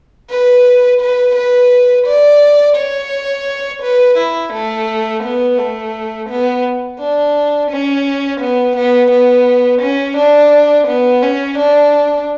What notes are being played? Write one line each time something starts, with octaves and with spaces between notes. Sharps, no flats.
B4
B4
B4
D5
C#5
B4
E4
A3
B3
A3
B3
D4
C#4
B3
B3
B3
C#4
D4
B3
C#4
D4